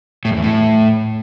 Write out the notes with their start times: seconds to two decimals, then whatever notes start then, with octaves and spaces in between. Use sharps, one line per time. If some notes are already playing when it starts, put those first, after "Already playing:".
0.25 A2
0.31 F#2
0.37 E2
0.43 A2